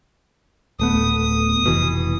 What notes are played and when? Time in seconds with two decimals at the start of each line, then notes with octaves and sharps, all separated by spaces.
0.79 D1 A3 B3 D#6
1.64 F1 B2 E3